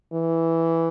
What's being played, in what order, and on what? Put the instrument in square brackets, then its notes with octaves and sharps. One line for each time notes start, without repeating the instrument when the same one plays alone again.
[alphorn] E3